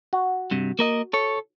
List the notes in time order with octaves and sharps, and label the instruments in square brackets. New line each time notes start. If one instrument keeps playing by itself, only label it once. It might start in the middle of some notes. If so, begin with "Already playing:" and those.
[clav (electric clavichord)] F#4
[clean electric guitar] G2 C3
A#3 A#4 D#5
A4 C#5